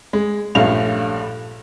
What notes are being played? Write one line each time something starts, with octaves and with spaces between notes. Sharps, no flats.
G#3
A#1 G2 A3 C#4 F5 F7